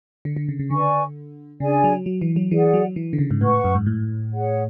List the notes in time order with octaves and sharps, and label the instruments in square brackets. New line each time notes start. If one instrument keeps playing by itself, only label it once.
[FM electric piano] D3
D3
C#3
C#3
[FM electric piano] D3 [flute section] B4 D5 G#5 C#6
[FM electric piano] C#3 [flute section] D4 G#4 D5 G#5
[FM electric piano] F#3
F#3
E3
F#3
[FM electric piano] E3 [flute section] G#4 D5 F#5
[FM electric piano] F#3
E3
D3
C#3
G#2
[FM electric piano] A2 [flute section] B4 F#5 C#6
[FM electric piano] F#2
G#2
A2
[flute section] G#4 C#5 F#5